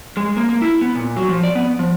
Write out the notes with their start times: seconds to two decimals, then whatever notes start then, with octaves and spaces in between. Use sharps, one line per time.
0.17 G#3
0.37 A#3
0.49 A#3
0.62 E4
0.81 B3
0.95 A#2
1.17 F#3
1.29 F3
1.43 D5
1.55 B3
1.79 F3